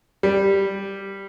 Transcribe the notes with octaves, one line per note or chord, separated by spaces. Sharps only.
G3